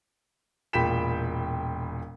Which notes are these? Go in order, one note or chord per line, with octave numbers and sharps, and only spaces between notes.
E1 A#2 G5 B5 B6 E7